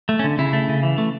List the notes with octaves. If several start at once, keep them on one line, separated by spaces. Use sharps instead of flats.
A3
C#4
D3
C#3 E4
A3
C#3
E3
A3